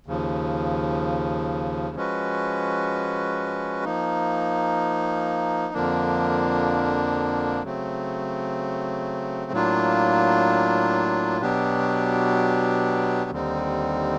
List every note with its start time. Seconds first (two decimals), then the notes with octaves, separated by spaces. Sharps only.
0.06 D#2 C#3 F3
1.96 F3 G#3 C#4 F#4 B4
3.85 F3 A#3 D#4
5.74 F2 D3 F3 A#3 D4
7.63 C#3 F#3 A3 C4
9.52 A2 F#3 A#3 D4 F4
11.41 B2 F#3 B3 D4 G4
13.30 D#2 D3 G3 C4 D#4